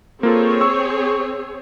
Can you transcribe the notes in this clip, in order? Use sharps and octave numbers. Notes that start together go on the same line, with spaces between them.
A#3 C4 F4 G#4 A4 C#5
C#6 E6